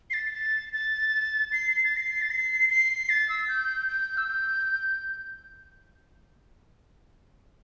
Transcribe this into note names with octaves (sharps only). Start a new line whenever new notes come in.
C7
A6
A6
A6
C7
C7
A6
C7
A6
C7
C7
A6
E6
G6
G6
E6
G6